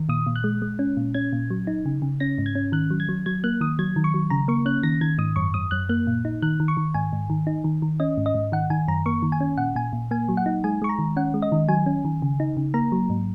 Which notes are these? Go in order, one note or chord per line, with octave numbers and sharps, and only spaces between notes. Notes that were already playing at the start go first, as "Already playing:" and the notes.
Already playing: D#3
A#2 D#6
A#2
F#6
G#3
G#3
C#4
A#2
C#4 G#6
A#2
F#3
D#4
C#3
C#3
C#4 A#6
G#2
G#6
C#4
D#3 F#6
F#3
G#6
F#3
F#3 G#6
A#3 F#6
D#3 D#6
F#3 G#6
D#3
C#6
F#3
C#3 A#5
A#3 C#6
C#4 F#6
D#3 A#6
D#3 G#6
G#2 D#6
F#2 C#6
F#2 D#6
F#2 F#6
A#3 F#6
A#2
D#4
D#3 F#6
D#3
C#6
D#3
G#2 G#5
G#2
D#3
D#4
D#3
D#3
C#4 D#5
G#2
D#5
G#2
D#3 F#5
D#3 G#5
F#2 A#5
A#3 C#6
D#3
G#5
C#4
A#2 F#5
A#2 G#5
A#2
A#3 G#5
F#3
F#5
D#4
G#3 G#5
G#3 C#6
A#5
D#3
C#4 F#5
G#3
D#5
D#3
F#3 G#5
C#4
D#3
C#3
D#4
C#3
A#3 A#5
F#3
G#2